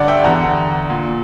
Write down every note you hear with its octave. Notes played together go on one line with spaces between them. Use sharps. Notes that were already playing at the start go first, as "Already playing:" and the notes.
Already playing: G2 D3 D5 F#5
E5 G5
E2 D3 F#5 A#5
A#2